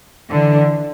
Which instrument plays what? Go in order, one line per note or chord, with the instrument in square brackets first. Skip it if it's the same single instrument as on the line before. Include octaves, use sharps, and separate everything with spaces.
[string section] D3 E3